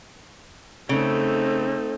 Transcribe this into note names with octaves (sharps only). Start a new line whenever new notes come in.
C#3 A3 C4 D#4 A4